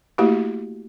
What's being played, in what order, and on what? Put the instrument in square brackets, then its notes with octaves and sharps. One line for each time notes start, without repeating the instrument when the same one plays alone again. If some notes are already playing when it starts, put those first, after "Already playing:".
[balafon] A3 A#3 E4 F#4 G4